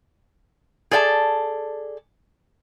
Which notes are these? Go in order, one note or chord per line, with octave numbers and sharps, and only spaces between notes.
G#4 A4 D5 G5 A5